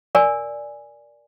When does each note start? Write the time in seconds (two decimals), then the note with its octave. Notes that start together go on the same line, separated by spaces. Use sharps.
0.15 A#4 D5 G#5